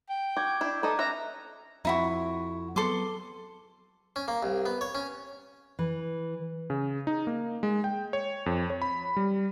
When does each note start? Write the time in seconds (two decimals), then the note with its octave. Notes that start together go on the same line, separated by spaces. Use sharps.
0.10 G5
0.37 F#4 D6 G6 G#6
0.61 D4 E4
0.83 A4 B4 D#5 A#5 D6
0.99 C#4 E5 A#5 F#6
1.85 F2 D#4 E4 F#4
2.76 F#3 B3 A4 C6 D6
4.16 C#4
4.28 A#3
4.43 C2
4.66 B3
4.81 C#5
4.95 C#4
5.79 E3
6.70 C#3
7.07 D#4
7.27 A#3
7.63 G#3
7.84 G5
8.13 C#5
8.46 F2
8.70 C#5
8.82 B5
9.17 G3